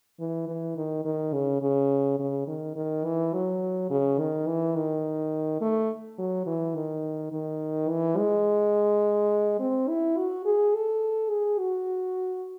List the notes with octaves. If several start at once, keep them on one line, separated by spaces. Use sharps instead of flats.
E3
E3
D#3
D#3
C#3
C#3
C#3
D#3
D#3
E3
F#3
C#3
D#3
E3
D#3
A3
F#3
E3
D#3
D#3
E3
G#3
C4
E4
F#4
G#4
A4
G#4
F#4